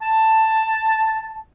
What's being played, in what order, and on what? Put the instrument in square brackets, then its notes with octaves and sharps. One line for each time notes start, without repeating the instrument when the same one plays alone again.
[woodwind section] A5